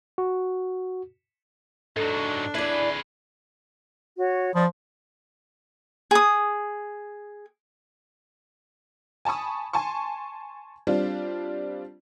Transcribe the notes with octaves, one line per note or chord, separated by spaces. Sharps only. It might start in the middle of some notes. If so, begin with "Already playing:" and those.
F#4
G#2 F#3 D4 A4
E4 G#4 B4 D5
F#4 C#5
F3 D5 B5 D#6
G#4 D#6
G#5 A5 B5 C#6 D#6
G#5 A5 C6 C#6
G3 C4 D4 F4